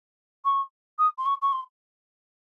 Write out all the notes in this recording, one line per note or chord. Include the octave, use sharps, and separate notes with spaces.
C#6
D#6
C6
C#6
C#6
C6